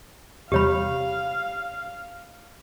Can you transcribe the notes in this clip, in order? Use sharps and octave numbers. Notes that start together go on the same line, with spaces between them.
E2 C3 G3 G4 C#5 F5 B5